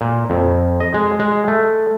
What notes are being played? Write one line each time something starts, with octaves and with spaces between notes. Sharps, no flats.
A#2
F2
D#5
G#3
G#3
A3